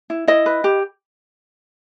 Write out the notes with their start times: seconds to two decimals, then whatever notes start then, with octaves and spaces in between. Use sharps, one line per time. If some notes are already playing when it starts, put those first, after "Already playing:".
0.10 E4
0.27 E4 D#5
0.46 B4
0.64 G4